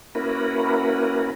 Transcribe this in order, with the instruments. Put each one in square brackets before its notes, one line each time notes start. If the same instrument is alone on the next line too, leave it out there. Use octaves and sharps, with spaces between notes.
[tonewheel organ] A#3 C#4 E4 F#4 A#4 B4